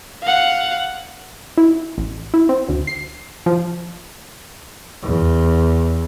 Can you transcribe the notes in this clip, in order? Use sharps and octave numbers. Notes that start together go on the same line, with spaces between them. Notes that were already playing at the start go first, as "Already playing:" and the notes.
F5 F#5
E4
A1
E4
C4
D2
C7
F3
E2